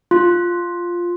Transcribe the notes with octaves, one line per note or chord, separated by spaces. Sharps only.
F4